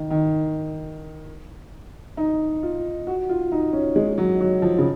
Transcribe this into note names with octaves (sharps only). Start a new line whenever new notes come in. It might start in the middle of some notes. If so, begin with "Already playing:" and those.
Already playing: D#3
D#3
D#4
F4
F#4
F4
D#4
C#4
G#3
F#3
F#3
F3
C#3